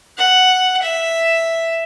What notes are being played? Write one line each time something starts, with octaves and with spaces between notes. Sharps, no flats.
F#5
E5